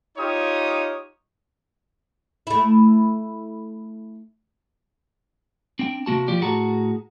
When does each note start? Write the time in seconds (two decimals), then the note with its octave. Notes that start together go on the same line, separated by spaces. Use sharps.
0.17 D#4 F4 G4 C#5 D#6
2.47 A3 E4
5.79 C4 D4 G5
6.06 C3 A#3 F#4 A5
6.28 F3 F4 G4 D5
6.42 A2 F#4 G#4 F#5 A5 A#5